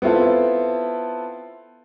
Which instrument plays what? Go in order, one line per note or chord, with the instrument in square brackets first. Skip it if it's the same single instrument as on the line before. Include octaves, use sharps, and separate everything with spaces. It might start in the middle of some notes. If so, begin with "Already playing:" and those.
[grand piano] B3 C4 E4 F4 A4